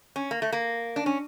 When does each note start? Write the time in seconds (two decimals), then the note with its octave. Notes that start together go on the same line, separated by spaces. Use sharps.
0.16 C#4
0.31 A#3
0.42 A3
0.53 A#3
0.96 D4
1.06 C#4